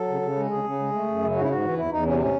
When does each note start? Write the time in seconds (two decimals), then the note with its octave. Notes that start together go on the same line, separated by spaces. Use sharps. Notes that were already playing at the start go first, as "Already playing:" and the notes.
Already playing: F#3 A4
0.08 C#3
0.22 C#3
0.36 G#3
0.51 C#3 G#4
0.64 C#3
0.79 G#3
0.93 A3
1.07 F#2
1.21 C#3
1.35 G#2 F#4
1.42 E4
1.49 G#2 F#4
1.64 E3
1.78 E2 E4
1.91 E2 D#4
2.05 C3 C#4
2.19 A2 C#4